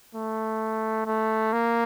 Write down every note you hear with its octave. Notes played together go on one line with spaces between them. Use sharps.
A3
A3
A#3